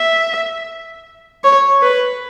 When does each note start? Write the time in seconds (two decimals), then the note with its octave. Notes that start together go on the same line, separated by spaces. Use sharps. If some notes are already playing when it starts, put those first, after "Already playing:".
Already playing: E5
1.44 C#5
1.83 B4